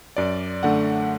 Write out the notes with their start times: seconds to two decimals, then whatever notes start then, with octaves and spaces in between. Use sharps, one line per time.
0.16 F#2 D5
0.63 D3 A3 F#5